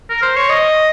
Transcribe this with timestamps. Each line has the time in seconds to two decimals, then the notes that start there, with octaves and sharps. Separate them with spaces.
0.09 A#4
0.22 C5
0.36 C#5
0.49 D#5